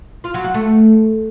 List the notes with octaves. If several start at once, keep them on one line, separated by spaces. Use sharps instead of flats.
F4
F#3
F#4
A3